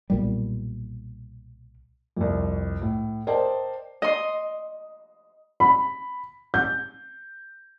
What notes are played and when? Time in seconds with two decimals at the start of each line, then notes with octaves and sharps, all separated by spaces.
0.10 B1 A#2 G3
2.17 C2 F2
2.81 A2
3.27 A#4 C5 D5 D#5 G5 A5
4.02 D#5 C6
5.60 B5
6.54 G6